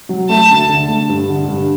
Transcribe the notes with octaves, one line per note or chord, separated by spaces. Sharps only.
F#3
A3 A5
D2
D3
A3
G2
D3
G2